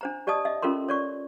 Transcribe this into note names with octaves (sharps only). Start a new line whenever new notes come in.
D4 C5 A#5
G4 D5 D#5 A5 D#6
D#5 E5
C#4 F4 A4 A#4 C6
C#5 D5 C#6